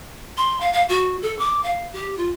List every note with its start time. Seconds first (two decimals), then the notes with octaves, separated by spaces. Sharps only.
0.37 C6
0.60 F5
0.73 F5
0.89 F#4
1.22 A4
1.39 D6
1.64 F5
1.93 G4
2.17 F4